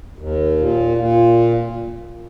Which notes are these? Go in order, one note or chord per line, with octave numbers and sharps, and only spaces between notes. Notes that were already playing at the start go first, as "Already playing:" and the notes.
D#2
A#2
A#2